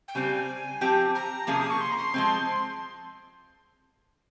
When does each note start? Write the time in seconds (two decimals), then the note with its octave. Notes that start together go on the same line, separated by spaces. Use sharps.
0.08 G5
0.15 C#3 G3 C4 G#5
0.81 F3 C4 G4
1.15 A#5
1.47 C3 F3 A#3 C#4 G#4
1.60 D#6
1.70 C#6
1.80 C6
1.91 A#5
1.97 C6
2.14 F3 G#3 C4